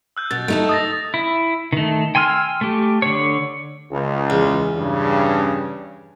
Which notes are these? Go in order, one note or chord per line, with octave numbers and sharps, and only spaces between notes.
E6 F#6 G6
B2 A6
A3 D#4 A5
D#6 A6 A#6
E4
D#3 A3
G5 G#5 C6 E6 F6
A3 G4
D3 C#5
C#2
E2
G2 C#3